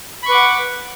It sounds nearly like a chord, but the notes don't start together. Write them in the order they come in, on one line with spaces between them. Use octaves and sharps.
B5 C#6 B4 D6 F#5